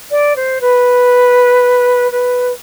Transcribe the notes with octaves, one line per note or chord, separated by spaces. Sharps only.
D5
C5
B4
B4